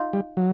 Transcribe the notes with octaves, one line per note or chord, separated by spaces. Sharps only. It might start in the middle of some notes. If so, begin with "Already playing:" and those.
Already playing: D#4 F4
G3
F#3